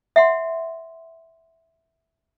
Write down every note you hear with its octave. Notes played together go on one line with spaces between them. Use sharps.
E5 F#5 C6